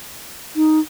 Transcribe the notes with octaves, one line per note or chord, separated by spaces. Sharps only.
D#4